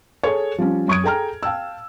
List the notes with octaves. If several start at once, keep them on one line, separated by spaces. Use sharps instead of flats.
G#4 A4 C#5
F3 G3 C#4
F#2 C#6 D#6 G#6 D7
G#4 A4 G5 A#5 F6
F5 G5 A5 E6